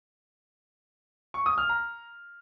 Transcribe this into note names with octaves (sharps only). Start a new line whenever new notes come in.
C#6
D#6
F6
A#5